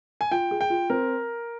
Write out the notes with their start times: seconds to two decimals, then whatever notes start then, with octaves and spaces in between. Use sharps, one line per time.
0.21 G#5
0.31 F4 G5
0.51 G#4
0.61 G5
0.70 F4
0.90 C4 A#4